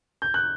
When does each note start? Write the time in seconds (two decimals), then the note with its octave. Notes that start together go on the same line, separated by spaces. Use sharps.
0.22 G6
0.34 F#6